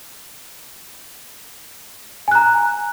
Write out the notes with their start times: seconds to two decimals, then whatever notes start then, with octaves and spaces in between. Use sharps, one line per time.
2.28 G#5
2.31 F#6
2.35 A#5